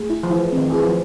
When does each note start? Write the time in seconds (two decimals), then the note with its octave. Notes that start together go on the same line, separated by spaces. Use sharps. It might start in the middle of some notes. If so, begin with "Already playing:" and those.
Already playing: A3 G#4
0.10 E4
0.23 F3
0.30 E3 E4
0.52 D#3 C4
0.70 E3 G#4
0.82 F3